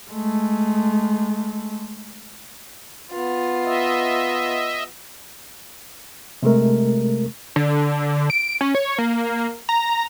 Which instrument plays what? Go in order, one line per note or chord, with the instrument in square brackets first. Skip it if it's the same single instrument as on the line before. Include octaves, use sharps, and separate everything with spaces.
[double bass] G#3 A3
[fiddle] B3 F4
[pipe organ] D#5 E5
[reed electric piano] C3 G#3 A3 A#4
[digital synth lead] D3
D7
C#4
C#5
A#3
A#5